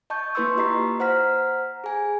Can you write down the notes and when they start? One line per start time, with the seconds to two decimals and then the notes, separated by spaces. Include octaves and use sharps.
0.10 D#5 A5 C#6 G6
0.35 A#3 E4 B4 C6 C#6 E6
0.57 F4 G4 D#5 A#5 B6 C7
1.00 C5 F#5 A#5 F6 B6
1.84 G#4 G#5